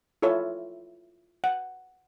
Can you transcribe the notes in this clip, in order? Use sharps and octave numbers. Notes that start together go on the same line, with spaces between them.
E4 F4 A4 C#5 E5
F#5